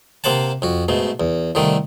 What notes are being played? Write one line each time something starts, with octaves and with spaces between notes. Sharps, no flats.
C3 A#3 C5 F#5 A5
F2 F#4
G#2 B2 A3
E2
C2 D3 D#3 A3